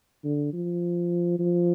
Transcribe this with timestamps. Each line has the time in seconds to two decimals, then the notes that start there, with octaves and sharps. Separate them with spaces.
0.24 D3
0.53 F3
1.39 F3